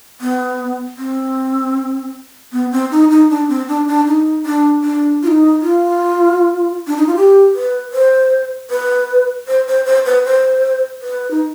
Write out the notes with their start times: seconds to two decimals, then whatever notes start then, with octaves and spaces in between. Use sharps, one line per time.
0.21 B3
0.98 C4
2.53 B3
2.72 C4
2.91 D#4
3.11 D#4
3.30 D4
3.49 C4
3.68 D4
3.88 D4
4.07 D#4
4.46 D4
4.84 D4
5.23 F4
5.28 D#4
5.61 F4
6.87 D4
6.97 D#4
7.07 F4
7.15 G4
7.55 B4
7.93 C5
8.70 B4
9.48 C5
9.67 C5
9.86 C5
10.06 B4
10.25 C5
11.02 B4
11.31 D#4